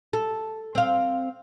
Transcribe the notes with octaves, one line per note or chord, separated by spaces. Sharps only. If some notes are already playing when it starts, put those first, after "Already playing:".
A4
C4 F5